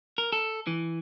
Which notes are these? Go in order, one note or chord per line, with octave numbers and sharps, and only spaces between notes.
A#4
A4
E3